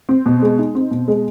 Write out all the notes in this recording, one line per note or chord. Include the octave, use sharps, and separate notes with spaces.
C4
B2
G#3
D#4
C4
B2
G#3